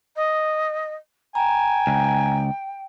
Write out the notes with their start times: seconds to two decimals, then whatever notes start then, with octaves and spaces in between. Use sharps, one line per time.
0.16 D#5
1.35 G5 G#5 A#5
1.87 C#2